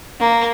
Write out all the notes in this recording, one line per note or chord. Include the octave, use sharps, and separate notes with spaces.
A#3